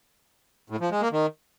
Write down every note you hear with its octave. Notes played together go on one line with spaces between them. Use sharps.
A2
F3
G#3
A#3
D#3